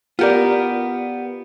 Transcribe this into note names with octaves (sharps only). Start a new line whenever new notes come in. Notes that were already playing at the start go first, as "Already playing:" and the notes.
B3 F4 G4 A#4 D5